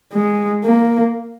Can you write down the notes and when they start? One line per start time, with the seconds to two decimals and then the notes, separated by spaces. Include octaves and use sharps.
0.14 G#3
0.64 A#3